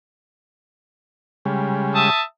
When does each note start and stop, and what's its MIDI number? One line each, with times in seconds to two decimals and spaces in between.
1.45 2.10 49
1.45 2.10 55
1.45 2.10 56
1.95 2.22 76
1.95 2.22 81
1.95 2.22 87